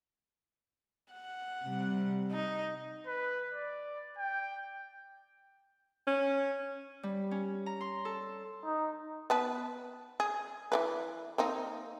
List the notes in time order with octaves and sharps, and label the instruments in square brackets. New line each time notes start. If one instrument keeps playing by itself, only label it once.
[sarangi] F#5
[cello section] C3 G3
[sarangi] D#4
[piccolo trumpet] B4
D5
G5
[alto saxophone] C#4
[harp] G3
C#4
A#5
C6
A4
[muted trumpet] D#4
[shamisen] B3 B4 A5
G#4
E3 A3 B4
A#3 C4 D#4